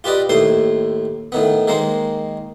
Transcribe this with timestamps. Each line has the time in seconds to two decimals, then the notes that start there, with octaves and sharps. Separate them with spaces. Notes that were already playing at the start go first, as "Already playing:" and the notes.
0.04 F4 G4 B4 D5 D#5
0.29 D#2 A2 C5 C6
1.32 A2 D#3 B3
1.68 D#3 G#3 A#3 C5